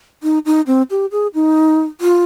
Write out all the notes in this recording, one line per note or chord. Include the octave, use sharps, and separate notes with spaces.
D#4
D#4
C4
G4
G#4
D#4
F4